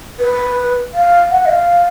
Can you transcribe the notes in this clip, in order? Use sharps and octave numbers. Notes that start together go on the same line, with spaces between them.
B4
F5
F#5
D#5
F5